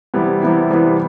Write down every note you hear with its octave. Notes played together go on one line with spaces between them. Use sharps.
C3 E3 G3 B3 E4
C3 E3 G3 B3 E4
C3 E3 G3 B3 E4